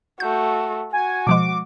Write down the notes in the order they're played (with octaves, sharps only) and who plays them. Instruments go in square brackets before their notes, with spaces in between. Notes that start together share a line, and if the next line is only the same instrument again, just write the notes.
[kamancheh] A3 F#4 [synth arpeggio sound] G6
[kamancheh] F#4 [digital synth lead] G#5
[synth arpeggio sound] B2 F3 G#3 [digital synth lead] D6